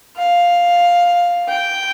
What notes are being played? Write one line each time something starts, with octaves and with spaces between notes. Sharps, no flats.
F5
G5